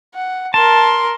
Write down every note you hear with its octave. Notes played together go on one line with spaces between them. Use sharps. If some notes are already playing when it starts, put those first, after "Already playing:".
F#5
A#4 A5 C6